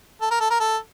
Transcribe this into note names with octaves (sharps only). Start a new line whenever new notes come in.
A4
A#4
A4
A#4
A4